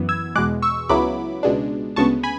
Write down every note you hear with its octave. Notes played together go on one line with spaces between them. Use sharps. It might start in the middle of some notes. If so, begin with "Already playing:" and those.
Already playing: F#2 E3 B3
E6 G#6
E2 B2 G#3 D6 F#6
C#6 E6
C#2 C#3 F#3 B3 E4 B5 D6
C#2 B2 G#3 D4
D2 C#3 G#3 B3 A5 C#6
G#5 B5